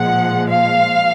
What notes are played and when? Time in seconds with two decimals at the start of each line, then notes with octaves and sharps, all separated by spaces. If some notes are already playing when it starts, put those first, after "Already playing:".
Already playing: A#2 F3 G#3 F#5
0.48 F5